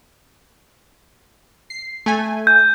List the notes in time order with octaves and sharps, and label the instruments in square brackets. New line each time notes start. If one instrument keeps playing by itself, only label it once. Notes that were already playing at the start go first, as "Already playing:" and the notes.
[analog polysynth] C7
A3 G#5
[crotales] G6